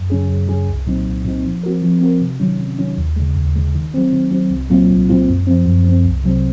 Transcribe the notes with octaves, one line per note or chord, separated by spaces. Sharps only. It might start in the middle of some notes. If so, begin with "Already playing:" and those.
Already playing: F#2
C#3 F#3 C#4 G#4
F#2
C#3 F#3 C#4 G#4
C2
A#2 F#3 C4 D#4
C2
A#2 F#3 C4 D#4
F3
C4 F#4 A#4
F3
C4 F#4 A#4
C3
D#3 F#3 C#4
C3
D#3 F#3 C#4
D#2
C#3 G#3
D#2
C#3 G#3
D#3
F#3 C4
D#3
F#3 C4
C2
A#2 F#3 C4 F4
C2
A#2 F#3 C4 F4
F#2
F3 C4
F#2
F3 C4
C2
C3 F#3 C4